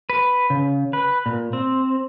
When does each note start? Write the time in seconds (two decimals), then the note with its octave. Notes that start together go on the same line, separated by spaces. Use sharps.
0.10 B4
0.50 C#3
0.93 B4
1.26 A#2
1.53 C4